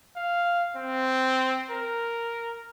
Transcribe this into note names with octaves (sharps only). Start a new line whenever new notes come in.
F5
C4
A#4